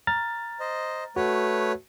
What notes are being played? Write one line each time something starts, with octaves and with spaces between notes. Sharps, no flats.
A#5 F6 A6
C5 D#5
A3 F#4 B4 C#5